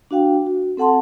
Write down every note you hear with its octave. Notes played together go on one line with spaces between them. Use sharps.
D4 F#4 F5 G5
F#4
C4 A4 F#5 A5 C6